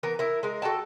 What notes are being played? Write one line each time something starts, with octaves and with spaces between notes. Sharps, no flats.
E3 B3 A#4
E4 A#4
G#3 A#4
F#4 A4 G5 A5